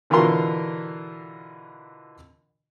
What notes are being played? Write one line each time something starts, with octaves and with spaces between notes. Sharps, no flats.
B2 D3 E3 F4 A#4 C6